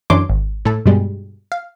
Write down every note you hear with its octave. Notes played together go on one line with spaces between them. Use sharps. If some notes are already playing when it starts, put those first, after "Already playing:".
F#2 E3 D4 C#5 C6 D6
G#1
A2 A4
G2 B2 G3 G#3
F5